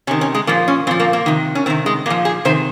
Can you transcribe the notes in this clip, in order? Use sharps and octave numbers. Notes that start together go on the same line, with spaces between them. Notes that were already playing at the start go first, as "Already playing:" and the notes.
C3 D#3 C#4
C#4
G#3
A#2 F3 A#3
C#4
A#2 F3 C4
A#3
A#3
C3 D#3
C#4
C3 D#3 C4
G#3
A#2 F3 A#3
G#4
C3 D#3 C5